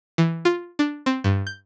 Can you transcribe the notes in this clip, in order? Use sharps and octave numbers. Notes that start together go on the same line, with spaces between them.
E3
F4
D4
C4
G2
G6